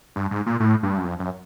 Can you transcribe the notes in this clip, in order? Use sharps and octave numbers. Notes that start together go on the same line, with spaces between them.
G2
G#2
A#2
A2
G2
F#2
F2
F#2